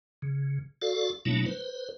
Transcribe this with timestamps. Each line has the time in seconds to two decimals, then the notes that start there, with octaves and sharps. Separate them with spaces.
0.22 C#3
0.82 F#4 A4 D5 F5
1.25 B2 F#3 A3 A#3 D4 E4
1.46 B4 C5